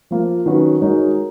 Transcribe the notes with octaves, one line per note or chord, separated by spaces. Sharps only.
F3 A#3 F4
D#3 F#3 C#4 F#4 B4
G#3 D#4 F#4 A#4 C#5